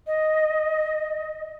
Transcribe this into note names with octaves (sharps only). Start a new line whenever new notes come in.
D#5